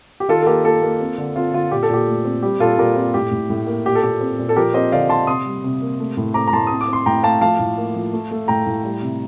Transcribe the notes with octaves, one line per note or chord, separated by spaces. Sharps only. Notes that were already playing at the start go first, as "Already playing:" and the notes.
G4
D#3 F4 A4
A4
A#3 G4 A#4
A#3 F4 A4
A#3
C4
D3
C4 F4
D3 F4
A#2 G4
A4
A#2 G4
A3
C4
G3 G4
A#2 F4 A4
A#2 G4 A#4
C4 F4
A2 G4
A2
A2
A#3
A#2 G4
A4
A#2 G4
C4
A#2
A4
F3 G4 A#4
C4 C5 D#5
D3 D5 F5
D3 A5 C6
C3 C6 D#6
G3
C3
A#3
A3
A2
C4 A#5 D6
A#5
A2 A5 C6
C4 D#6
D6
C4 C6
A2 G5 A#5
A3 F5 A5
F3 F5 A5
A2
A#3
F3
A3
A3
A2 G5 A#5
A2
G3
C3